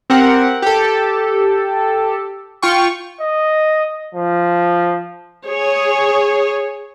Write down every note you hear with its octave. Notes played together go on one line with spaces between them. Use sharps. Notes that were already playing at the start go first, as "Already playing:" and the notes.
C4 G4 A#4 F#5
G4 A4
F4 G5 C#6
D#5
F3
G#4 C#5